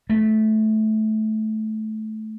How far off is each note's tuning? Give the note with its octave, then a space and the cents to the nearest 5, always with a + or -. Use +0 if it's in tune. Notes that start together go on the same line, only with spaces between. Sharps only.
A3 -15